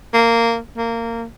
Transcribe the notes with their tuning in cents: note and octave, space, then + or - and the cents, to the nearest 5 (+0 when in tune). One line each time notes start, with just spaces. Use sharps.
A#3 -15
A#3 -20